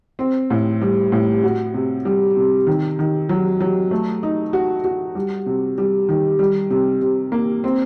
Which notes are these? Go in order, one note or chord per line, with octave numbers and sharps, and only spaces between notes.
C4
A2
G3
A2
F#4
C3
G3
C3
D#3
D#3
F#3
F#3
A3
D#4
F#4
F#4
G3
C3
G3
D#3
G3
C3
C3
A#3
C4